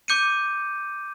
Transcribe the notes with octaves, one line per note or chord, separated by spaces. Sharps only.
D6 G6 C#7 D#7